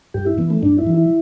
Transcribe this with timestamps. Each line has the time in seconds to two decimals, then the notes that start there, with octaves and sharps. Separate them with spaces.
0.14 G2 G4
0.26 E4
0.38 E3 B3
0.50 A3
0.63 G2 D4
0.78 E4
0.87 E3
0.94 E4